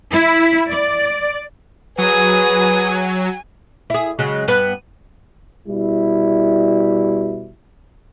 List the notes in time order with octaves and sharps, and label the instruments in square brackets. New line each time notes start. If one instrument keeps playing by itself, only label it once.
[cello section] E4
D5
[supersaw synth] F#3 [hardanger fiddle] G#4 D#6 [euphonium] B4 [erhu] G#5
[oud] E4 G#4
C#3 F#3 G#3
G2 B3 B4
[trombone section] B2 G3 E4